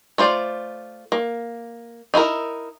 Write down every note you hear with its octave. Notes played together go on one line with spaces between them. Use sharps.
A3 F4 C5 D5
A#3
D#4 E4 F#4 A#4